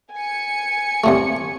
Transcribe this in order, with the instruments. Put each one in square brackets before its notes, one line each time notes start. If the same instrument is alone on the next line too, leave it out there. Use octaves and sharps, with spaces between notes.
[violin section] G#5 C#7
[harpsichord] C2 A2 A3